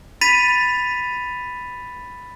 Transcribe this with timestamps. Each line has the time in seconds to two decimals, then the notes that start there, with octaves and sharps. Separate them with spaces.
0.21 B5 A6 B6 D#7 F7